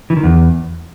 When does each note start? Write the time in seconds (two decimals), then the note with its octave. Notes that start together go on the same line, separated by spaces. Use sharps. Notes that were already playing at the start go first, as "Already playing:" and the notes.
0.10 E3
0.17 D#3
0.23 E2